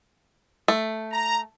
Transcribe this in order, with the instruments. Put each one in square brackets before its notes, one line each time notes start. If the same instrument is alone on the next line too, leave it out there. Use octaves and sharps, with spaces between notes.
[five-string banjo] A3
[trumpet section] A#5